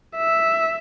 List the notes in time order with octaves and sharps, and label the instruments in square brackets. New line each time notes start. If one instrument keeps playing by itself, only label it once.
[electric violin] E5